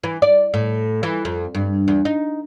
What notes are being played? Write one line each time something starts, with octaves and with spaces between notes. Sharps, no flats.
E3
D5
A2
E3
F2
G2
E2
D#4